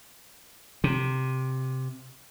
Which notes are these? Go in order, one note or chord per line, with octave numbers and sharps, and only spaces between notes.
C3